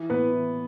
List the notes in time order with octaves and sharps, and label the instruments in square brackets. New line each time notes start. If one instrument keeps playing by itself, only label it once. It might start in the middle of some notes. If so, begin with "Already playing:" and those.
Already playing: [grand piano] E3
A2 B3 B4
E3